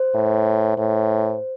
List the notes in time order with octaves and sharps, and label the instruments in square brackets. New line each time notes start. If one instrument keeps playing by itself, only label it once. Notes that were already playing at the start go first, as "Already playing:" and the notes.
Already playing: [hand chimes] C5
[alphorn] A2
A2